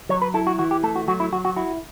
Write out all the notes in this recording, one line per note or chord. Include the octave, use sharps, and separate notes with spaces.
F#3 C#5
B4
E4 A4
F#4
E3 F#4
G4
A3 A4
F#4
F#3 F#4
E4
F#3 F#4
F#4
E4 F#4